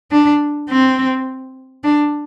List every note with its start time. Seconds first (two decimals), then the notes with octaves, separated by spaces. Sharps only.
0.11 D4
0.69 C4
1.84 D4